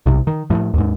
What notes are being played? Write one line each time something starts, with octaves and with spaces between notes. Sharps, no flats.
B1 C3
D#3
A2 F3
D#2 G#2